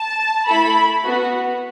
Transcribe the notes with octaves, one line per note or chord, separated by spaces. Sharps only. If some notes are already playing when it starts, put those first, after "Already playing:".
Already playing: A5
A3 E4 A4 B5
B3 F#4